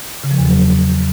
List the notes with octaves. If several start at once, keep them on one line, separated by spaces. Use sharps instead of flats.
C#3
F3
E2
F#3